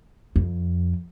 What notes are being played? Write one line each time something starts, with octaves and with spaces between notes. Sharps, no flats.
F2